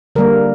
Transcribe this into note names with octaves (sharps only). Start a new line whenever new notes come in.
D3 G3 A#3 A#4